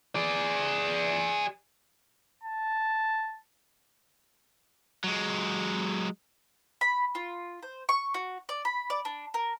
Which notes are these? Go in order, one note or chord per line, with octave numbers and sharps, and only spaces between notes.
G#4 D5
A5
F#3 G#3
B5
F4
C5
C#6
F#4
D5
B5
D5
D4
A#4